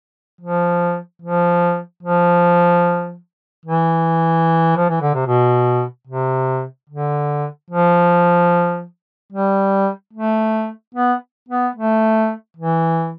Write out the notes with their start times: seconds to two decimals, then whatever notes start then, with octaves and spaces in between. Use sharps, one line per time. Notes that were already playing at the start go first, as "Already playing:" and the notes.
0.41 F3
1.22 F3
2.03 F3
3.65 E3
4.77 F3
4.90 E3
5.02 D3
5.15 C3
5.27 B2
6.08 C3
6.89 D3
7.70 F3
9.32 G3
10.13 A3
10.94 B3
11.49 B3
11.75 A3
12.57 E3